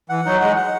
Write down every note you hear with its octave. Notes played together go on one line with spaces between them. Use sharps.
E3 F#5
F#3 D#4
G#3 F#5
F#5